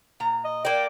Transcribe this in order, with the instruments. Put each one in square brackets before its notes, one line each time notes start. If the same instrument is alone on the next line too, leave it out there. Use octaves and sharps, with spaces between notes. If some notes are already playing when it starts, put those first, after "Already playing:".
[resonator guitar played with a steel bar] A#2 A#5
[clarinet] D#5
[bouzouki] A#3 D5 [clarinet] G5